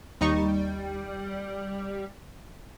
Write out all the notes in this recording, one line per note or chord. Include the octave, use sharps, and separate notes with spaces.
D#2 G3 D#4 C#6